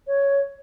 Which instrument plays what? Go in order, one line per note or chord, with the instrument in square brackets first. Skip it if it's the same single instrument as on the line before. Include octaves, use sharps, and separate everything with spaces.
[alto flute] C#5